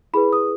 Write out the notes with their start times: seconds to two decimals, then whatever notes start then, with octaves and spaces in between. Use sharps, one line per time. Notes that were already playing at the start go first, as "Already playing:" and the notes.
0.13 E4 G#4 B4 B5
0.33 D#6